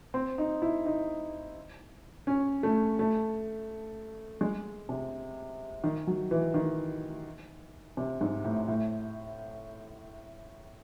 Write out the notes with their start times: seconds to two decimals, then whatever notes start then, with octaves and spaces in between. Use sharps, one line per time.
0.14 C4
0.38 D#4
0.62 E4
0.86 D#4
2.27 C#4
2.63 A3
2.99 A3
4.41 G#3
4.89 C3
5.84 D#3
6.07 F#3
6.31 E3
6.54 D#3
7.97 C3
8.21 G#2
8.44 A2
8.68 A2